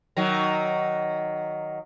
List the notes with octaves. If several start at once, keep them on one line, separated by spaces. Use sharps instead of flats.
D#3 F#3